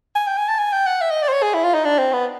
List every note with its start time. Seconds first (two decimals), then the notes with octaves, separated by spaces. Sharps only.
0.16 G#5
0.27 G5
0.37 G#5
0.49 A5
0.59 G#5
0.72 G5
0.86 F#5
1.01 E5
1.11 D#5
1.22 D5
1.28 C5
1.33 C#5
1.42 G#4
1.54 E4
1.64 F4
1.74 D#4
1.85 D4
1.99 C4
2.13 B3